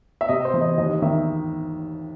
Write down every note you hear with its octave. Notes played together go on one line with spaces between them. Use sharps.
E5
C3 D#5
C5
E3
D#5
D#2 D#5
D#3 E5